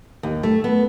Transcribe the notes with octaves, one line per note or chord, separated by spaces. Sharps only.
D#2
A3
B3